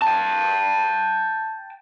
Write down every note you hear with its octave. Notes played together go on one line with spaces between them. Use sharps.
G5 A5